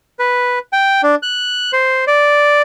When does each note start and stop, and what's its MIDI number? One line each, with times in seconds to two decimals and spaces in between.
0.19 0.59 71
0.73 1.01 79
1.03 1.15 62
1.23 1.71 90
1.73 2.05 72
2.07 2.62 74